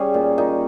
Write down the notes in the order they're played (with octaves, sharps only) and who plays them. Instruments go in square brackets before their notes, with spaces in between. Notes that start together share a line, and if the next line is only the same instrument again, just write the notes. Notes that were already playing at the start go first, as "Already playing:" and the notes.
Already playing: [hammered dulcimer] G3 C#4 G#4
A#2 D#4
A#2 D#4